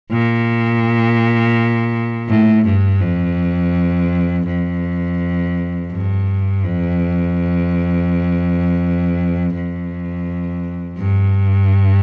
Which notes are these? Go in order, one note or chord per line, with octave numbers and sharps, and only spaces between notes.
A#2
A2
G2
F2
F2
G2
F2
F2
G2